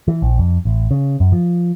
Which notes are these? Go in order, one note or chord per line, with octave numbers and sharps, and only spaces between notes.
E3
A#1
F2
A1
C#3
F#2
F3